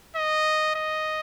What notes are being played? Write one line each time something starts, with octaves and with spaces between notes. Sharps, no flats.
D#5
D#5